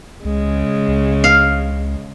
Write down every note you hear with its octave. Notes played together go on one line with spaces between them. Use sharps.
C#2 C#3 G#3
C#2
F5